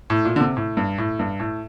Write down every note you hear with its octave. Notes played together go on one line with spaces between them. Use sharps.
A2
A#2
D3
C3
A2
G2
A2
G2
A2